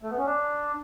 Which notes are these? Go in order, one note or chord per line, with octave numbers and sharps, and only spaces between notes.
A3
B3
C#4
D4